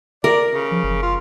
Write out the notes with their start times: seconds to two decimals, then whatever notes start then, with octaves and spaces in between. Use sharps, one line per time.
0.24 A#4 D5
0.51 C#3
0.71 F3
0.83 F#1
1.02 F4